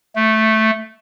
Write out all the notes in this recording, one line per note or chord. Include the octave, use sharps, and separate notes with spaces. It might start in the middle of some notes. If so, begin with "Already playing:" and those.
A3